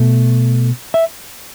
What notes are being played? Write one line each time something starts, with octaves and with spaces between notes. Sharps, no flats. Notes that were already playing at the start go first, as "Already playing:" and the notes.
Already playing: B2 A3
E5